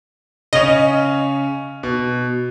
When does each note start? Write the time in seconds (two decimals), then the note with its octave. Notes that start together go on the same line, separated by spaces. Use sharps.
0.53 C#3 C#4 D#5
1.83 B2